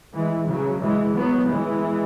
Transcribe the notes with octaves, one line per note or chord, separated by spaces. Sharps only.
E3 G#3
C#3 F#3
E3 G#3
F#3 B3
E3 G#3